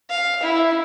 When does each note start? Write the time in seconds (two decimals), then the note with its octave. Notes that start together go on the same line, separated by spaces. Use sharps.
0.10 F5
0.43 E4